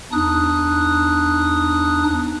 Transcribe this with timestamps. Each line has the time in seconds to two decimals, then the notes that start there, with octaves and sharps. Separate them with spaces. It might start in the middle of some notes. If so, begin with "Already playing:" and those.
0.12 E2 D4 D#4 D#6 F#6